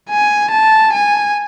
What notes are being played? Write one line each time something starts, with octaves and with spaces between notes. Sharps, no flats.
G#5
A5
G#5